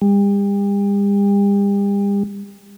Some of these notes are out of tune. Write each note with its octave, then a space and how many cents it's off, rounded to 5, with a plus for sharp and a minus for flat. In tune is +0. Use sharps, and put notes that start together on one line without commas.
G3 +40